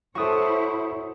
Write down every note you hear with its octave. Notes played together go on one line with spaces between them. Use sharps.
E4 F#4 A4 C5 C#5 C#6 D#6